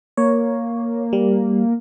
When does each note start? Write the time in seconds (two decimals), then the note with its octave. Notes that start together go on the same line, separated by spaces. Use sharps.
0.17 A#3 C#5
1.13 G3